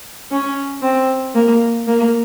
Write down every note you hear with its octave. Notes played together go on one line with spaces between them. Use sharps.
C#4
C4
A#3
A#3